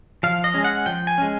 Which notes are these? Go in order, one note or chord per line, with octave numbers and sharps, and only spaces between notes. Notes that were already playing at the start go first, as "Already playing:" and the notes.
F3 F5
D#5
G#3 C#4
F#5
F3 G5
G#5
G#3 C#4